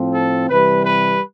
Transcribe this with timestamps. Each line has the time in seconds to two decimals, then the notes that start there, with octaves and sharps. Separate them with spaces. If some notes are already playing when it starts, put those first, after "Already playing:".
Already playing: A2 F3 C4
0.14 A4
0.50 C3 E3 G3 B4
0.85 B4